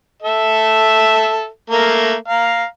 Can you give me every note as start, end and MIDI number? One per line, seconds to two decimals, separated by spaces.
0.23 1.47 69
0.23 1.47 76
1.70 2.14 57
1.70 2.14 58
1.70 2.14 70
2.28 2.64 77
2.28 2.64 82